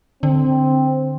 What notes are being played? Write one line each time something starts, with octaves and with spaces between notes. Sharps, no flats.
D3 C4